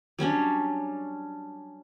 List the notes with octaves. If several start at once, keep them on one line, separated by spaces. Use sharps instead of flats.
F#3 G3 C#4 D4